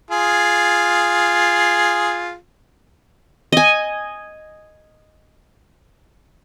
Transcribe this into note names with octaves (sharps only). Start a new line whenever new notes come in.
F4 G#4
D#5 G#5